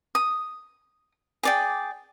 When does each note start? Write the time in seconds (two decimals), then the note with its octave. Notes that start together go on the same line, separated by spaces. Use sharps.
0.15 D#6
1.43 G#4 D5 G5